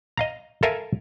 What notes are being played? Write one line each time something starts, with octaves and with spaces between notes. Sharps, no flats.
D#5 F5 A#5
A4 A#4 E5 F5 G#5